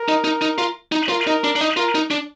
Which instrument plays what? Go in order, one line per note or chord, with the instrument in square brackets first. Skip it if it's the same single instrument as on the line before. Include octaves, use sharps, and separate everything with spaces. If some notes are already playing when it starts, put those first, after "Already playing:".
Already playing: [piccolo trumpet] A#4
[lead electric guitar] D#4
D#4
D#4
F4
D#4
[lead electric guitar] F4 [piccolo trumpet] A#4
[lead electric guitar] D#4
D4
D4
D#4
[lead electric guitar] F4 [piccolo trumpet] A#4
[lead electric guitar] D#4
D4